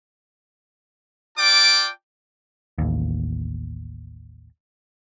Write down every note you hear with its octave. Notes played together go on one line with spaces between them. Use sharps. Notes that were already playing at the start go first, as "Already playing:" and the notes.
F4 D5 G5 A5 D6
A1 D#2